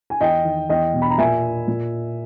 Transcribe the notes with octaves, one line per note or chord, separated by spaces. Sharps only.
G#5
E2 D#5 G5
D#3
E2 D#5 G5
B2
B5
A#5
A#2 E5 G#5
A#2